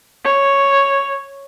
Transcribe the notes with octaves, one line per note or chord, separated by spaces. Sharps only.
C#5